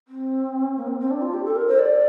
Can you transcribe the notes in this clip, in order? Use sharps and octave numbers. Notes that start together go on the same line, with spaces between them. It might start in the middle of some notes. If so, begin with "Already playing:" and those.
C4
A#3
C4
C4
D4
F4
G4
A4
A#4
C5
D5